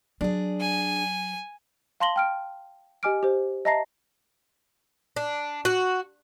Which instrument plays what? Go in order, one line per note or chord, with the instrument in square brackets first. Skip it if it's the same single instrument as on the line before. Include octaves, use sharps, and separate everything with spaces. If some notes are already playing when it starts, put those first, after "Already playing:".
[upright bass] F#3 [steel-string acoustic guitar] D4 G#4
[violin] G#5
[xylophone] F5 A5 C6 A#6 F#7 G7
G5 F6 D7
G4 D#5 G#5 D6 F6 D7
G4 C5
D#5 E5 A5 A#5 A#6 C7
[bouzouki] D4
F#4